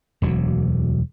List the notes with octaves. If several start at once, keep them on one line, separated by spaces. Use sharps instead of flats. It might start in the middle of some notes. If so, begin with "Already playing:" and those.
E1 D2 F#3